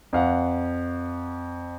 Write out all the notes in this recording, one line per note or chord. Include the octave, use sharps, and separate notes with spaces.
F2 F5 F#5